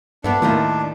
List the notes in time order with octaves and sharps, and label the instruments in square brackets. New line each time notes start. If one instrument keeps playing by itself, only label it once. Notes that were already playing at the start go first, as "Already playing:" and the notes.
[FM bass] G2 [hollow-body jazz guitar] A3 B3 G4 [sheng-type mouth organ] D4
[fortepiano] D#2 A2 [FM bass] D#3 [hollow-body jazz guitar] E4 F4 A#4